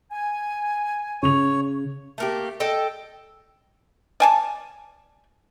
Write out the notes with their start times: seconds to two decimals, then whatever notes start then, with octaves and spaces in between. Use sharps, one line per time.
0.11 G#5
1.23 C#3 C#5 F7
2.18 A3 A#3 G4
2.60 A4 D#5 G5
4.20 D5 G#5 A5